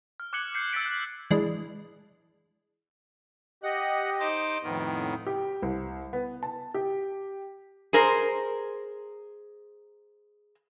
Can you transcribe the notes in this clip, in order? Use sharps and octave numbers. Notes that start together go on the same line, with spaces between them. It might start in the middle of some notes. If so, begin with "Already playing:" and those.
F6
D6 F#6 G#6 C#7 F#7 G7
G6 C7 C#7
E6 G#6 A6 B6 D7
F#6 D7
E3 G#3 D4
G4 D#5 F#5
D#4 C5 D6
F2 A2 D#3 B3
G4
C2
B3
A5
G4
G#4 A#4 C5